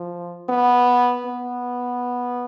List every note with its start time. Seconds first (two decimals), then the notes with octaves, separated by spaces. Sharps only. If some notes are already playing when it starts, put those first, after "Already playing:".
Already playing: F3
0.49 B3
1.27 B3